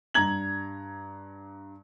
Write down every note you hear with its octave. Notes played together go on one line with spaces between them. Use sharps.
G2 A#5 G#6 F#7